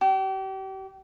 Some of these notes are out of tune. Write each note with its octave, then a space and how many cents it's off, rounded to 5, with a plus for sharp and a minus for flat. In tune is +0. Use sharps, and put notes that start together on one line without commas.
G4 -35